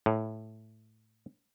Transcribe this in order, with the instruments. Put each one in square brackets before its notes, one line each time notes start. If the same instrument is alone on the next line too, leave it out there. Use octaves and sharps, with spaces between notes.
[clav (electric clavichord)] A2